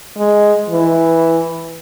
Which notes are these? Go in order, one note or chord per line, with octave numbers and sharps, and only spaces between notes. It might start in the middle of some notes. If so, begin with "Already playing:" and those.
G#3
E3